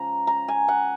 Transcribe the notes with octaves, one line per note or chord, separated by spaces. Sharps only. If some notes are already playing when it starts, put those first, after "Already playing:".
Already playing: C#3 F3 G#3 A#5
A#5
G#5
F#5